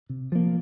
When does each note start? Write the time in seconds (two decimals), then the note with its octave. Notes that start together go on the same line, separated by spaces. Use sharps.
0.10 C3
0.32 F3 A#3